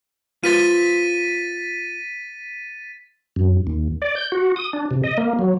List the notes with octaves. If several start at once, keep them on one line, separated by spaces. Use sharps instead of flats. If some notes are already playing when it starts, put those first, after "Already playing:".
F4 B4 C5 A6 B6 D#7
F#2
D#2
D5
G6
F#4
D#6
D4
C3
D#5
A#3
F#3